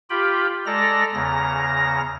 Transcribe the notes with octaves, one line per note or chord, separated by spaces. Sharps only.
F4 G4 G5 B5
G#3 A4 D5 A#5 A#6
E2 C#3 A#5 A#6